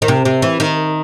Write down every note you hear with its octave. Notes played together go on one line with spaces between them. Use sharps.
D#3
C3
C3
E3
D#3